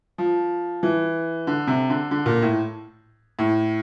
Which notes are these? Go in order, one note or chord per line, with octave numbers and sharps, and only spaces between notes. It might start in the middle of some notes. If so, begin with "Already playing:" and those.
F3
E3
D3
C3
D3
D3
A#2
A2
A2